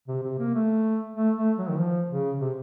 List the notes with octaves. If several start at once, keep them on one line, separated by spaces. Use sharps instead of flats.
C3
C3
A#3
A3
A3
A3
F#3
D#3
F3
C#3
C3